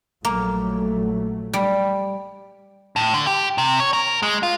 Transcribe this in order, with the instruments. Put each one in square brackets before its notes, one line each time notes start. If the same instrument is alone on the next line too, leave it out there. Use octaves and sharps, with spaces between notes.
[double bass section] A#1 F#3 A3 [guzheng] A#3
[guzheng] G3
[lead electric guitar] A2
D3
G4
C3
C#5
A#4
G#3
F4